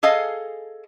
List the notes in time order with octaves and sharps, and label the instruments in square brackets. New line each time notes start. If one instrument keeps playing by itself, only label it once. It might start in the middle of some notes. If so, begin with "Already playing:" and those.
[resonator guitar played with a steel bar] G#4 A4 D#5 F5 G#5